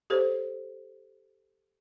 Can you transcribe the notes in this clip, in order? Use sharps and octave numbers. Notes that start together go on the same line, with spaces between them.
G4 A4 C5 C#5